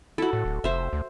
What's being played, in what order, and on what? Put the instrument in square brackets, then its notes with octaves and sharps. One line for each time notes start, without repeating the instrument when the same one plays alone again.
[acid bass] E4 [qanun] F#4 A4
[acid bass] A2
D1
[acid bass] F1 [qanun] C5 E5
[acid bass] D2